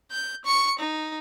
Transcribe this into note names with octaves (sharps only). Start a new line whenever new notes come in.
G6
C#6 C#7
D#4